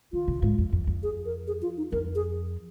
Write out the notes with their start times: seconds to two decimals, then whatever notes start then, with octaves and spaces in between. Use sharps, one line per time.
0.13 D#3 F4
0.28 C3
0.42 G#2
0.58 F2
0.72 F2
0.87 F2
1.03 G#4
1.25 A#4
1.47 G#4
1.62 F4
1.77 D#4
1.92 F2 A#4
2.15 G#4